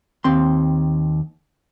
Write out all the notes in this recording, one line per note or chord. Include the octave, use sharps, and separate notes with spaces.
D#2 C4 C6